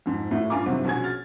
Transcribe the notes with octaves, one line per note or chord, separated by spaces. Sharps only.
F2 G#2
A2 A3 F#4
G2 F4 F5 G#5 A#5 D6
G2 C3 D#3 F#3 C4 F#4
A#1 B2 C#4 F#4 G#4 G#6
F6 A6